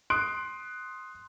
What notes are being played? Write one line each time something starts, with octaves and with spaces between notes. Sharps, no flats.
C6 D#6 F#6 D7